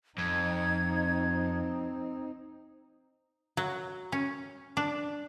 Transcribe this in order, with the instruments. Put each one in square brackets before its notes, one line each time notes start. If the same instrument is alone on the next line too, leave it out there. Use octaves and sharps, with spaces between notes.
[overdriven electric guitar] F2 [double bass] C4 D#4 [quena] G#6
[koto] F#3
C#4
D4